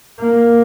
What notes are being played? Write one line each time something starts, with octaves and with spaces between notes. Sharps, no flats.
A#3